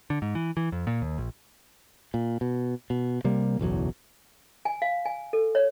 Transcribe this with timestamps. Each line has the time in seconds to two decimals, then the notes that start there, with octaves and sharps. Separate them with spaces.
0.10 D3
0.22 G#2
0.35 E3
0.57 E3
0.72 F2
0.87 A#2
1.02 D#2
1.18 A#1
2.14 A#2
2.41 B2
2.90 B2
3.24 C3 G3 A#3
3.59 F#1 B1 E2 F#3
4.65 G#5
4.82 F5
5.05 G#5
5.33 A4
5.55 C#5